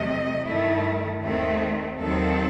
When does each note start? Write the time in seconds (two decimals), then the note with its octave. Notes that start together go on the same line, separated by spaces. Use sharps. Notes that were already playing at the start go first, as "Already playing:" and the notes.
Already playing: E2 C3 F#3 A3 D#5
0.45 G2 D#3 A3 E4
1.22 D#2 D#3 A3 C4
1.98 D#2 D#3 F#3 C4 A4